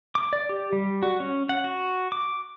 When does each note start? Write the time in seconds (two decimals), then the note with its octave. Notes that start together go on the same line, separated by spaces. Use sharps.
0.15 D6
0.33 D5
0.49 G4
0.73 G3
1.03 F#4
1.20 C#4
1.49 F#5
1.64 F#4
2.12 D6